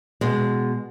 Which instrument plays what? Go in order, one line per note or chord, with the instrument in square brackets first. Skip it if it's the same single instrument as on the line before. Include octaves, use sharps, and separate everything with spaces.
[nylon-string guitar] B2 G#3